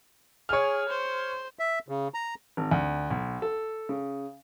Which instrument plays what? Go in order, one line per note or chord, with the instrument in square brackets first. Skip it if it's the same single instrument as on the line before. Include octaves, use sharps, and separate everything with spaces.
[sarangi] G#4 [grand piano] C#5 F6
[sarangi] C5
[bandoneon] E5
C#3
A#5
[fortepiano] G#1
D2
B1
A4
C#3